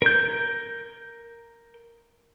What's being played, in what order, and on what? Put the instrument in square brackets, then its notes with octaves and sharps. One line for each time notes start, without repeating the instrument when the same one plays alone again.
[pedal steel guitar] A#4 G6